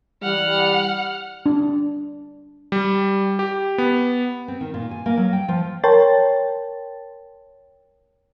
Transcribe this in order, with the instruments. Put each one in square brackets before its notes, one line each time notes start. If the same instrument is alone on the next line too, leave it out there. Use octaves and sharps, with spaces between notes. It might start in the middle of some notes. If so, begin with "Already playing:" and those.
[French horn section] E3 G3 [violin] F#5 F6
[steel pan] D4
[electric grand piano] G3
G4
B3
[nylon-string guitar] C4
D#3
A#2
G#5
A#3
F#3
G5
F3
[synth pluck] A#4 C#5 G5 A5 C6 A6